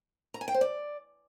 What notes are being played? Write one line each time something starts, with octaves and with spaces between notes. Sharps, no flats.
A#5
G#5
G5
C5
D5